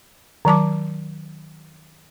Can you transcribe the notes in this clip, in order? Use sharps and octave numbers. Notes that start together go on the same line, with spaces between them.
D#3 F#3 A5 D6